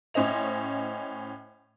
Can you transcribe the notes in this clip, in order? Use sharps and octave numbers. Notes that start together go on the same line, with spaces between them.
A2 C#4 C5 D#5 F7